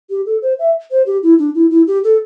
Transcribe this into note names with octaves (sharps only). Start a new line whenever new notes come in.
G4
A4
C5
E5
C5
G4
E4
D4
E4
E4
G4
A4